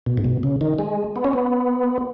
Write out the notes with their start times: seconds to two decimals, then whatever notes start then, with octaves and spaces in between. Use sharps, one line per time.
0.06 B2
0.17 G#2
0.24 B2
0.43 C#3
0.61 D#3
0.79 G#3
1.16 B3
1.24 C#4
1.33 B3